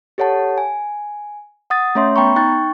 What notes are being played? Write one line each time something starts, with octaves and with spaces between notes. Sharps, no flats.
G4 A4 C#5 F#5 A5
G#5
F#5 D#6 A6
A3 C#4 C#5 E5 C6
B3 G5 A#5 B5 C#6
D#4 G5 C#6 F#6 A6